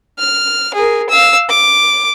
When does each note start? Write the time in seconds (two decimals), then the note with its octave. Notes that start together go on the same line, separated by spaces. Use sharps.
0.19 F6
0.74 G#4 A#4
1.10 F5 E6
1.49 D6